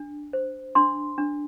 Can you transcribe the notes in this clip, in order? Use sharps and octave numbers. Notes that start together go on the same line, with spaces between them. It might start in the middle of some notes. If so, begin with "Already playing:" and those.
Already playing: D4
C5
D4 C6
D4